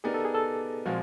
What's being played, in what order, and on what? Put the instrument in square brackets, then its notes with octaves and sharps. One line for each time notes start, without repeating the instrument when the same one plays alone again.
[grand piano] B3 D#4 G4 A#4 D5 [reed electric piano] G#4
[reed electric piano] A4
G#4
A4
[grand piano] A#2 F3 G#3 C4 [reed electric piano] F#4